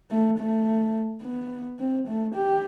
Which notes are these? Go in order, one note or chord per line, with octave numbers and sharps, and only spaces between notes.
A3
A3
B3
C4
A3
G4